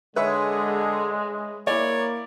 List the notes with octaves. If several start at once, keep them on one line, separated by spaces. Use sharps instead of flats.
D3 G#3 G#4 B4 C#5 E5
A#3 E4 C#5 D5